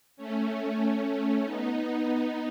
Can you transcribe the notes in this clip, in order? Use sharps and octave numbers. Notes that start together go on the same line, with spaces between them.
A3 C#4
A3 C#4
B3 D#4